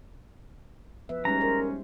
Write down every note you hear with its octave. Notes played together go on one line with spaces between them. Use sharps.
F3 B3 B4 E5
G3 G#3 C#4 D#4 A#5
A#4 C5